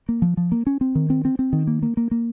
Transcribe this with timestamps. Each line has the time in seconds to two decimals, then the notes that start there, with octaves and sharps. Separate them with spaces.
0.09 A#3
0.22 F3
0.37 F3
0.52 A#3
0.67 C#4
0.81 C4
0.95 D#3
1.10 C4
1.25 C4
1.39 C4
1.53 D#3
1.67 A#3
1.83 A#3
1.97 A#3
2.11 A#3